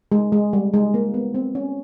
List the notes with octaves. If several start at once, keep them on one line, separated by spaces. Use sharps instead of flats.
G#3
G#3
G3
G#3
A#3
B3
C4
C#4